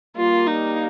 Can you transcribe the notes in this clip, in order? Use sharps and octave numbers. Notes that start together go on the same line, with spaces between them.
G3 A#3 F4
D#4